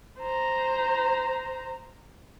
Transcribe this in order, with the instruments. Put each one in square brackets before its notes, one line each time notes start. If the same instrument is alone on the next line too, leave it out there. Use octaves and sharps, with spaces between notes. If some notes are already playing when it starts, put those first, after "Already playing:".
[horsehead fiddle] C5 A#5